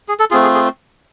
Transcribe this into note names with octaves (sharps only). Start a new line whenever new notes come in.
G#4
A4
A3 C4 F4 G#4
G#4
G#4